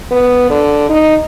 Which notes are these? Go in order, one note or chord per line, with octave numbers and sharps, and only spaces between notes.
B3
D3
D#4